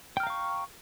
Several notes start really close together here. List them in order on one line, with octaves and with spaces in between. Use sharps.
G5 F6 A#5 F5 C#6